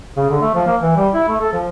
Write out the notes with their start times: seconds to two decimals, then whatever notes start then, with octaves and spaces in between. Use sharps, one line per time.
0.17 C#3
0.30 D3
0.41 A3
0.55 F3
0.67 A#3
0.81 E3
0.96 G3
1.14 E4
1.28 A3
1.41 A4
1.53 F3